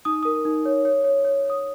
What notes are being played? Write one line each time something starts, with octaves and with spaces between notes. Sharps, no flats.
D#4 D#6
A#4 D#6
D#4
C#5
C#5
C#5
C#5
C#5 D#6